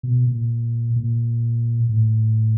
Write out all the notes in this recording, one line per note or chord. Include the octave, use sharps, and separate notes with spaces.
B2
A#2
A#2
A2